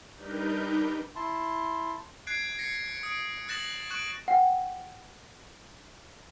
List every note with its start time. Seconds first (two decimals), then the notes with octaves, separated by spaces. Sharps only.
0.15 G3 D4 D#4 A#4 B4 G6
1.16 E4 A5 C6
2.27 F#6 G#6 C7 D7
2.59 A#6 C#7
3.03 D#6 D7
3.48 D#6 F#6 A6 A#6 E7 F#7
3.90 C#6 F#6 D7 F#7
4.28 F#5 G5